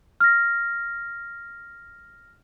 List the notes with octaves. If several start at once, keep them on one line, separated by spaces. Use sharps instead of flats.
F6 A#6